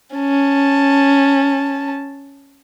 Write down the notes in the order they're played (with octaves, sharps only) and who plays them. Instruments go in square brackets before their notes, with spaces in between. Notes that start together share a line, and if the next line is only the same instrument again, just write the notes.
[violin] C#4 A5